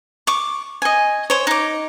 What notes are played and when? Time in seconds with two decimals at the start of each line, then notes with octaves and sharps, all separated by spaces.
0.27 C#6 D6
0.82 D#5 G#5
1.30 C5 C#5
1.47 D#4 D6